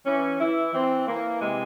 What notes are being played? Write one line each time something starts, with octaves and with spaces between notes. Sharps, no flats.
E3 C#4
E3 E4
E3 C4
E3 A#3
C3 G#3